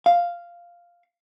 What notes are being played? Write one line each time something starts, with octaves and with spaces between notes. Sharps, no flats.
F5